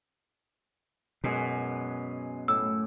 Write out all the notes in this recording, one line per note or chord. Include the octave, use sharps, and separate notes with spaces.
F#2 B2 G#3 G#5
A2 E6